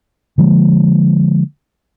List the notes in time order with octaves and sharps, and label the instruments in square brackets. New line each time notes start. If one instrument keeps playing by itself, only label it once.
[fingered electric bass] D3 F3 G#3 A#3